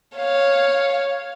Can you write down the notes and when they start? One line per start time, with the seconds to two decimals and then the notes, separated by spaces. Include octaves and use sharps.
0.17 C#5 F5